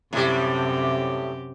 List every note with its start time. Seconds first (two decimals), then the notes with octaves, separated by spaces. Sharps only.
0.13 F#2 A2 C3 G3 G4